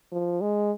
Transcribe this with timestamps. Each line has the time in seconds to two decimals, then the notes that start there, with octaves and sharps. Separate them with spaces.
0.12 F3
0.41 G#3